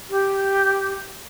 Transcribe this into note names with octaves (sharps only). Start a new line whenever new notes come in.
G4